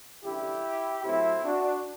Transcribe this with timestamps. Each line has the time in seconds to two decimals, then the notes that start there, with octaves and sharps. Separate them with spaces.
0.22 A1 G2 D3 E4 G4
1.04 A2 F#3 A3 C4 E4
1.45 D4 F#4